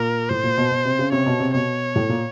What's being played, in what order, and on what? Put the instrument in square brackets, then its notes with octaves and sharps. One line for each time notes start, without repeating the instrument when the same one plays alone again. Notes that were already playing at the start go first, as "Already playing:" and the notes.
Already playing: [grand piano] A#2 [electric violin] A#4
[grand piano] A2 [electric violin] C5
[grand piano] A#2
B2
B2
C3
C#3
[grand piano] C3 [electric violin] C#5
[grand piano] B2
C3
[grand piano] B2 [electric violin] C#5
[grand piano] A2
A#2